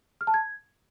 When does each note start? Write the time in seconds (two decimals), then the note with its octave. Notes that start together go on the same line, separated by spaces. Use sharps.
0.21 F6
0.27 A5
0.34 G#6